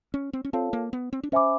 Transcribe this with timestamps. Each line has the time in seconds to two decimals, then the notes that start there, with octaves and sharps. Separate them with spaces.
0.14 C#4
0.33 C4
0.45 C#4
0.53 C4 F4 A4 C#5 F5 A5
0.73 A#3
0.93 B3
1.13 C4
1.23 D4
1.32 C#4 C5 E5 G#5 B5 D6